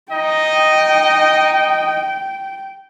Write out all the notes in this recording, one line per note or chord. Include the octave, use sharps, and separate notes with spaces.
D#4 D#5 G5